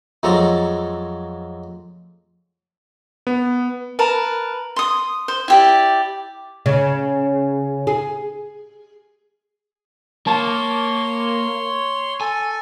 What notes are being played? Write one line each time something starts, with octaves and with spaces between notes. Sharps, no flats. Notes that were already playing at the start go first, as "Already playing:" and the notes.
F2 F#3 G#3 C4 A4 A#5
B3
A#4 B4 A5
C6 D#6
C5
E4 G4 D5
C#3
G#4
A#3 C#5 A5 C6
A4 G#5